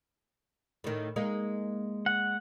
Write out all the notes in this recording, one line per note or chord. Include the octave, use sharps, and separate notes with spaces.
A2 D#3
G#3 A#3 D#4
F#5